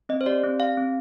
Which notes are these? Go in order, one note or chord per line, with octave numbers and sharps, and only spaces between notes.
C4 D#5
C5
G4 D5
C4
G4 F5
C4